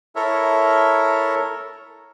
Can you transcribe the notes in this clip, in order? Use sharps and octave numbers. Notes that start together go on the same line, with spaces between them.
E4 A4 A#4 C#5 E5